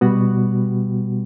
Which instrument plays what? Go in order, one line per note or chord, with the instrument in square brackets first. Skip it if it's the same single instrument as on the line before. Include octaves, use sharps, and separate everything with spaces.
[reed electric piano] B2 G3 B3 F#4